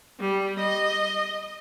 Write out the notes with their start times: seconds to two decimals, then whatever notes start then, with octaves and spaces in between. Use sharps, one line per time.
0.20 G3
0.59 D#5